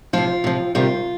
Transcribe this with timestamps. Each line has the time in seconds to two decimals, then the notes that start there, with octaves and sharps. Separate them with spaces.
0.13 C3 F3 F4
0.44 C3 F3
0.75 C3 D#3 G3 F4